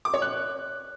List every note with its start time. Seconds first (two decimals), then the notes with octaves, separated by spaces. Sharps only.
0.05 D6
0.14 C#5
0.22 F#6